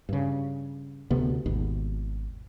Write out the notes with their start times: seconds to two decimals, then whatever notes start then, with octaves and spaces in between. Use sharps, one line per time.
0.09 G2 C#3
1.10 D2 C3 B3
1.46 G#1 D#2 B2